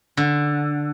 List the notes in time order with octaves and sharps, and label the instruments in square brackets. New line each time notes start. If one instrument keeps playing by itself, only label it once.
[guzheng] D3